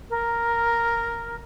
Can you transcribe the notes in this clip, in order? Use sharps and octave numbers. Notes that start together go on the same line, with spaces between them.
A#4